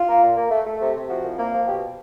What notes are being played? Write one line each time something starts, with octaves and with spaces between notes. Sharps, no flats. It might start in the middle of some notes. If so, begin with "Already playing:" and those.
Already playing: F4
A#3
A#2
A#3
A3
A3
C3
C3
F3 F#4
C2
A#3
F3
B2 G4